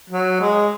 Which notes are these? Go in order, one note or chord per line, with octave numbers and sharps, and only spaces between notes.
F#3
G#3